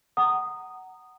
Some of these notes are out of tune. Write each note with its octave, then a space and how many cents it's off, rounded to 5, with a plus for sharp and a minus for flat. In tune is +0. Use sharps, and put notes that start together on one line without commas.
F#5 +15 A#5 -15 D#6 -10